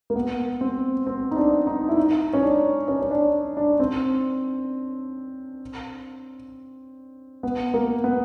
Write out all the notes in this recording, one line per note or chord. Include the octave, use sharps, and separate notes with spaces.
A#3
B3
C4
C4
D#4
D4
D#4
E4
D#4
C#4
D4
C#4
C#4
D4
D4
C4
B3
A#3
B3